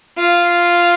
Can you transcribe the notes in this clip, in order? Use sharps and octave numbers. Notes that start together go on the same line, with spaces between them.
F4